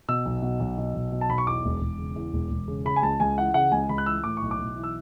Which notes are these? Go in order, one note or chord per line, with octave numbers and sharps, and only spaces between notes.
B2 E6
B1
B2
B1
B2
B1
B2
A5
B1 B5
C#6
E2 D6
E1
E1
C#3
E2
E1
E1
C#3
C#3 B5
G#5
C#2 A5
C#2 G#5
E3 F#5
C#3 F#5
C#2 G#5
C#2 B5
F#6
E3 E6
A2 D6
B1 C#6
D6
B1
E3
E6